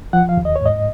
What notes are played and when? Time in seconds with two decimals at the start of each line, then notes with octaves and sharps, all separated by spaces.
0.13 F3 F#5
0.29 F5
0.37 D#2
0.45 D#5
0.56 C#5
0.61 G#2 D#5